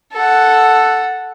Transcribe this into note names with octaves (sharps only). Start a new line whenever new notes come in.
A4 F#5